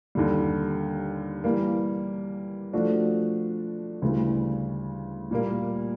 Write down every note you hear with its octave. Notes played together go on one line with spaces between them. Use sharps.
D#2 D3 G3
E3 G3 A#3
F3 A3 D4 F#4
D2 C#3 E3 G3
A#2 G3 A#3